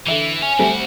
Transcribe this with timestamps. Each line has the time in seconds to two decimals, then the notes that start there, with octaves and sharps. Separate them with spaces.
0.06 D3 E3 E5 D#7
0.42 C#4 C#5 G#5
0.59 D2 G3 A3 C4 F#4